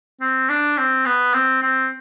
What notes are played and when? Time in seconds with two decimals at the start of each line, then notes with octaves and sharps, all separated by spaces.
0.21 C4
0.49 D4
0.78 C4
1.06 B3
1.34 C4
1.62 C4